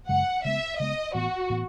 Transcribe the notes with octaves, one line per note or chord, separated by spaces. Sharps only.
F#2 C#3 G#3 F#5
C#3 G#3 B3 E5
C#3 G#3 B3 D#5
A2 E3 B3 F#4
A2 E3 B3